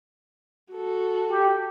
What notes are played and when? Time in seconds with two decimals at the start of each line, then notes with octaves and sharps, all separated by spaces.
0.72 F#4 A4
1.30 G4